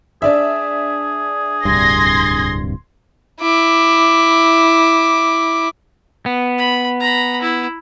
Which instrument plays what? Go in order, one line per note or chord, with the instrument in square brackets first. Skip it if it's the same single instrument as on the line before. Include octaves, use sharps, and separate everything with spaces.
[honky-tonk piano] D4 D5 E5 [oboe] G#4
[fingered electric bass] D1 C2 G2 [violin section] C6 G#6 A#6
[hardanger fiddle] E4 D6
[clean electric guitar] B3
[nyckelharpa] B5
A#5 B5
E4